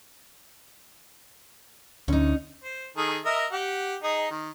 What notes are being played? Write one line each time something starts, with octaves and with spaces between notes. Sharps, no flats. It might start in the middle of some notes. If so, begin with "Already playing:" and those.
D2 C#4 D#4
C5
D#3 G#4 A4
A#4 D#5 E5
G4 F#5
D#4 G#4 D#5
D#3